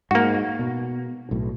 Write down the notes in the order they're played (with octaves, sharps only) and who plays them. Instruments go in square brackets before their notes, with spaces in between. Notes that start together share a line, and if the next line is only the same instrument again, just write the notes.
[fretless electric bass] G#2 [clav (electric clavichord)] A#3 F#4
[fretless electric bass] B2
B1 A2